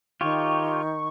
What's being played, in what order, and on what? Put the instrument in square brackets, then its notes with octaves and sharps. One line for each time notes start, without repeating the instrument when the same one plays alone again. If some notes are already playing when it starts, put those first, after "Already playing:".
[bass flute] D#3 [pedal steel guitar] F4 G4 C#5 [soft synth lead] C#6